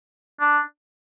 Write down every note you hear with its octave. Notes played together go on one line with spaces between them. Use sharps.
D4